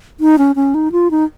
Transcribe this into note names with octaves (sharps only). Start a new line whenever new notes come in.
D#4
C#4
C#4
D#4
F4
D#4